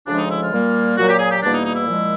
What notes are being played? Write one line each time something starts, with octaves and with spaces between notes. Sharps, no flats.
D2 C#3 F3 G#3 D4
D#4
E4
F4
A#2 G3 A#3
A#2 F#3 A#3 F#4
G4
G#4
G4
E2 B2 G3 A#3 D4
D#4
D#4
E4
A#2 F3 G#3